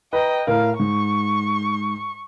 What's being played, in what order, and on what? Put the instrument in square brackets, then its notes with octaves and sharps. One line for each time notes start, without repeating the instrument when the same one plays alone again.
[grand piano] B4 A#5 [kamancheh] D#5 G5
[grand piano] A2 A#4 [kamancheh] F5
[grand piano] G#2 [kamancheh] C#6